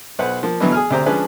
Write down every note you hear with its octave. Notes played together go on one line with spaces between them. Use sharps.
B1 B4 C5 F#5
F3 A#3
B2 D3 E3 F#3 A3 B3
G#4 G#5 F6
D2 C3 G4 C5 A#5
F3 G#3 C#4 D4 B4